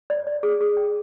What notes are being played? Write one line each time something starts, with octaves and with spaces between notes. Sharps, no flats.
D5
D5
G#4
G#4
G5